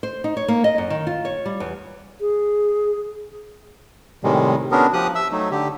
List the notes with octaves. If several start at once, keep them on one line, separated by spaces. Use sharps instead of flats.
C5
D#4
C#5
A#3
D#5
F#2
D#3
F4
C#5
G3
E2
G#4
A2 C3 D#3 G3 G#3
B3 C#4 D4 F#4 G#4 A#4
F3 G4 D#6 F#6
E5 E6
F#3 A3 D#4
D3 G4